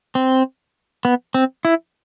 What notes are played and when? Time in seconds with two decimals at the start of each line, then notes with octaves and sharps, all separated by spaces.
0.15 C4
1.05 B3
1.34 C4
1.65 E4